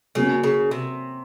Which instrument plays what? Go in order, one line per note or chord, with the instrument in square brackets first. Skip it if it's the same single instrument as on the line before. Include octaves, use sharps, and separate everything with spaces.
[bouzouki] C#3 [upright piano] F#3 A#3 C#4
[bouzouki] C#3
C3